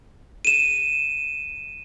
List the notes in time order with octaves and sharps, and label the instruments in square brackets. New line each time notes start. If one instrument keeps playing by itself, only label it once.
[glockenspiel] D#7 E7